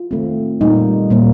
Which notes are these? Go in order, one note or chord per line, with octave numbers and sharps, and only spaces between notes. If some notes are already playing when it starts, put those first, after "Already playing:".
Already playing: F4
D#3 A3 C4
A#2 G3 A#3 D#4
A#2 G3 A#3